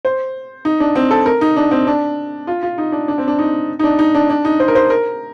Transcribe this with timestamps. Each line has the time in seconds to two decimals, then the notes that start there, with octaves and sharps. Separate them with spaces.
0.05 C5
0.65 D#4
0.80 D4
0.95 C4
1.11 A4
1.26 A#4
1.41 D#4
1.57 D4
1.71 C4
1.87 D4
2.47 F4
2.63 F4
2.78 D#4
2.92 D4
3.08 D4
3.18 C4
3.28 D4
3.39 D#4
3.79 D#4
3.84 D4
3.99 D#4
4.15 D4
4.30 D4
4.45 D#4
4.60 C5
4.68 A#4
4.75 C5
4.90 A#4